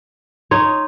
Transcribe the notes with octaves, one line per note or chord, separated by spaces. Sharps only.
D#4 C#5 C6